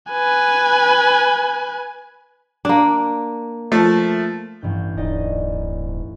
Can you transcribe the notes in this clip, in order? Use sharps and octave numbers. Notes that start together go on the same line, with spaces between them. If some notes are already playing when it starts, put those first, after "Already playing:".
B4 G#5
A#3 D4
F3 A3
A1 G2 G6
D1 D#4 D5 D#5